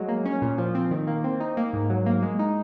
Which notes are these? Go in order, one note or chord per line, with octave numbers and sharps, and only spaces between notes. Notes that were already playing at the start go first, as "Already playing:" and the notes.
Already playing: F#3 G#3
A#3
C#4
A#2
F3
C4
D#3
A#3
C4
D#4
A#3
G#2
F#3
A#3
G#3
D#4